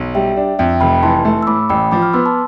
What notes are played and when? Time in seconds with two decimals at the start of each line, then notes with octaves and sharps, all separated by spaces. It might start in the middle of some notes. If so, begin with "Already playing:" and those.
Already playing: B1
0.15 G3 E5 G5
0.37 D4
0.59 F2 E5 G5
0.80 F1 G5 B5
1.03 E3 A5 C6
1.25 A3
1.43 E6
1.47 A2 B5 D6
1.69 A1 G5 B5
1.91 F3 B5 D6
2.02 D6 F6
2.13 B3 C6 E6
2.26 A5 C6